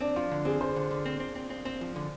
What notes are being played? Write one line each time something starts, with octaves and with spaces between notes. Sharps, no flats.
C4 D4
F3 F4
D3
C4 G#4
D3 C5
D3
D3
C4
C4
C4
C4
C4
F3
D3